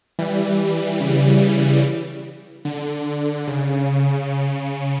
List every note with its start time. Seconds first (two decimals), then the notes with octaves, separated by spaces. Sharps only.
0.19 E3 G3
1.00 C#3 E3
2.65 D3
3.48 C#3
4.30 C#3